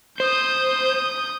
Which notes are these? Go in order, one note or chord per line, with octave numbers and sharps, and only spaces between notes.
C5 D#6 G6